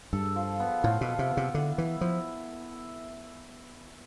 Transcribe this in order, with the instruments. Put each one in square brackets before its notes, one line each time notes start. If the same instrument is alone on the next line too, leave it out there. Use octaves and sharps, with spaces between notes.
[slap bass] G2 [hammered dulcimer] A4
[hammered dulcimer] F3
B3
[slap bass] A2 [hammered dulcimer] F4
[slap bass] B2
[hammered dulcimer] A4
[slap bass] C3
[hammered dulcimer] B3
[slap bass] C3
[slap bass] D3 [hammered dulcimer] E4
[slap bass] E3 [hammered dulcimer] E4
[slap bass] F3 [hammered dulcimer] E4